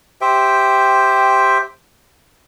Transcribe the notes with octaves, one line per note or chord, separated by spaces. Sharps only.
G4 C5 E5 G5